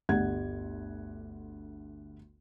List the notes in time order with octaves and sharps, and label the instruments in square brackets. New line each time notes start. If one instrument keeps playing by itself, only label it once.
[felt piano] G1 D2 G4 F#5 G#6